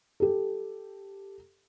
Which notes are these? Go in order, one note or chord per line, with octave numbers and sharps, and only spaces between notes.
G4 A4